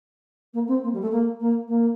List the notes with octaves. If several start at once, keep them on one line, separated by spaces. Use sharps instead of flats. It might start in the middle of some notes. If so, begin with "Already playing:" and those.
A#3
C4
A#3
G3
A3
A#3
A#3
A#3